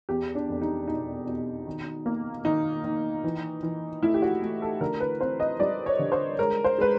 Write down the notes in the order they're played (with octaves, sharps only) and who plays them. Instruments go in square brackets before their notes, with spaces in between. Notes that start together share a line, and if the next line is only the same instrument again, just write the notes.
[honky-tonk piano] E2 G4
D4
F1
D#4
B2 D#4
B2
D#3
A#3
D#3 D#4
D#3
E3
E3
A3 E4
G4
F#4
A3
A4
D3 A#4
B4
C4 C5
D#5
G3 D5
C#5
D3
C5
G#3 A#4
C5
G#3 B4